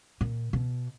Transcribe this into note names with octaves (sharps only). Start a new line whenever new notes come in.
A#2
B2